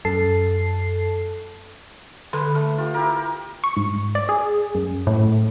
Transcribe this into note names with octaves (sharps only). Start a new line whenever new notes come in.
F#2 A4 A5 C7
D3 A4 B4 C6
A3 A4
F4 G4
E4 G4 A#4
C#6
G#2
D5
G#4
F#2
A2